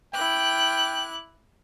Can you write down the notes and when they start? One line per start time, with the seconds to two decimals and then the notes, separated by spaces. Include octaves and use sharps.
0.14 E4 G5 D6 F#6